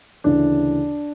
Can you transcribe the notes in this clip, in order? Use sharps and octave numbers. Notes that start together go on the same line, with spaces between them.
D2 C#3 E3 D4